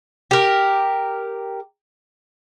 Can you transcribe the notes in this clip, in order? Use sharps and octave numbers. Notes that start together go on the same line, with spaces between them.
G4 A#4